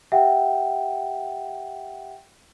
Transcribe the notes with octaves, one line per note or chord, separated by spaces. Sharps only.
G4 E5 F#5 G5